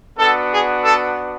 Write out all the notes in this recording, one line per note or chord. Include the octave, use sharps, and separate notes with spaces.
B3 D4 F#4 A4
G#4
A4